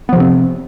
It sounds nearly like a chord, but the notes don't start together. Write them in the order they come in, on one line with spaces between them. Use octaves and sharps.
B3 F3 C3 C4